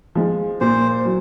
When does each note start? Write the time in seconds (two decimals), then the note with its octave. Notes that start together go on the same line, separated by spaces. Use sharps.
0.15 F3 G#3
0.61 A#2 C5
1.05 F#3